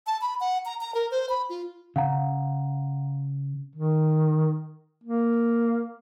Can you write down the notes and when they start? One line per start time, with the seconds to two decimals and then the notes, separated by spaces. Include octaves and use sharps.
0.07 A5
0.21 B5
0.40 F#5
0.66 A#5
0.81 A#5
0.95 A#4
1.11 C5
1.29 B5
1.50 F4
1.96 C#3 F5 F#5 A#5
3.75 D#3
5.04 A#3